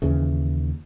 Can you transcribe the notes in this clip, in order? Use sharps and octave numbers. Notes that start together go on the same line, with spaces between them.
D#2 C#3 E3